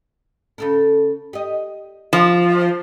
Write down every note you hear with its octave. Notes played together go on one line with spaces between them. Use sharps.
C#3 A4 A#4
G4 D#5
F3